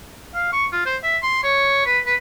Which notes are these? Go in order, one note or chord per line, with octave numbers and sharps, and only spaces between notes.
F5
C#6
F4
C5
E5
C6
C#5
B4
B4